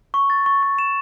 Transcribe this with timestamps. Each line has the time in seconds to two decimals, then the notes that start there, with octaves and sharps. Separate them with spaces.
0.14 C#6
0.30 A6
0.46 C#6
0.63 C#6
0.79 E7